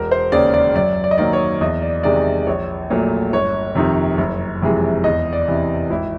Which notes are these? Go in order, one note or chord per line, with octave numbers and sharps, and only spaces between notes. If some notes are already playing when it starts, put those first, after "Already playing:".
Already playing: E1 A#4
C5
D#2 C#3 D5
D5
F#2 D5
D5
D#5
D#3 F#3 A#3 D5
C#5
E2 D#5
D5
C3 D#3 G#3 D5
A#1 C#5
A#2 F#3 A3
G1 C#5
F2 C3 D#3
F#1
F2 C3 E3 G#3
E2 D#5
D5
C3 E3
G#1 E4